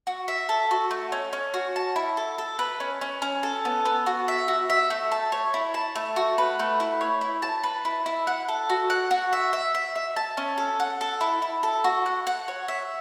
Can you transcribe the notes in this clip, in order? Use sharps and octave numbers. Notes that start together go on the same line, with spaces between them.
F#4
E5
A4
F#4
A3
C#4
C#4
F#4
A5
E4
A4
A4
B4
C#4
C#4
C#4
A4
B3
B3
F#4
E5
F#4
E5
A3
A5
C#5
E4
A5
A3
F#4
B4
A3
E4
C#5
E4
A5
B4
E4
E4
F#5
A4
F#4
F#5
F#4
E5
E5
E5
E5
A5
C#4
A4
F#5
A4
E4
E4
A4
F#4
F#5
F#5
C#5
E5